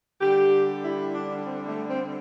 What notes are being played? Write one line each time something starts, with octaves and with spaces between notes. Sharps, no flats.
D3 G3 G4
E4
D4
C4
A3
C4